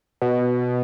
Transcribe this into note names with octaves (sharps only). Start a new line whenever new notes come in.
B2